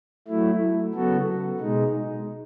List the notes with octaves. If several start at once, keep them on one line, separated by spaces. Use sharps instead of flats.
F#3 A3 E4
C#3 F#3 B3 F#4 A4
B2 G#3 D#4